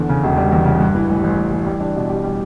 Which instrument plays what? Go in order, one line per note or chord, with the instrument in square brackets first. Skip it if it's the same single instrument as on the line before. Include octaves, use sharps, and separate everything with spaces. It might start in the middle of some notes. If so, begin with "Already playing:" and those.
Already playing: [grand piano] E2 D3
C#3
E1
G3
E2
C#3
G2
E3
A1
A1
G2
E3
G3
D4
B2
G4
G3